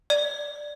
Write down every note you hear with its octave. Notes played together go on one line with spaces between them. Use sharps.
D5